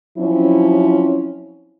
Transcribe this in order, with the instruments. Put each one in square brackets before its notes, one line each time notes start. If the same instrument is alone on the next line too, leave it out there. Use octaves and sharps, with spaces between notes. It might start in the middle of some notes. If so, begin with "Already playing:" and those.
[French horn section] F3 F#3 C4 C#4 E4